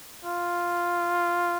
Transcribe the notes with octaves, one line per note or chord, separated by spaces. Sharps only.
F4